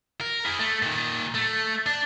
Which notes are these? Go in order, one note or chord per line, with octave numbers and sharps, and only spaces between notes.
A#4
E4 G#4
A3
A#2 D#3
A3
D4